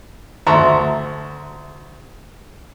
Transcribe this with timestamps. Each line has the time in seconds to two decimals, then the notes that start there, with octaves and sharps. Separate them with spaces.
0.47 D2 E5 A5 A#5 C6 C#6